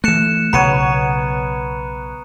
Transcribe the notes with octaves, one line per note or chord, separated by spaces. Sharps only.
E3 A3 F#6 C#7 E7
B1 C#3 B3 C#5 A#5 C#7 D#7